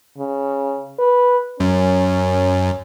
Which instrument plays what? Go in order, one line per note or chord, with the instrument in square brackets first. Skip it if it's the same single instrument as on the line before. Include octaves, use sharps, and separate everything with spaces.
[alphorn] C#3
B4
[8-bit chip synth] F#2 [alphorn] C#4